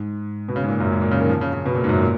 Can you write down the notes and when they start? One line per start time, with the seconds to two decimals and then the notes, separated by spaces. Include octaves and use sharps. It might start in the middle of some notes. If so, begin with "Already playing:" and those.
Already playing: G#2
0.48 B2
0.56 C#3
0.64 G#2
0.68 A#2
0.80 F#2
0.92 G#2
1.01 A#2
1.11 C#3
1.20 D#3
1.29 F3
1.41 C#3
1.53 C#3
1.66 B2
1.75 A#2
1.84 G#2
1.89 F#2
2.02 A#2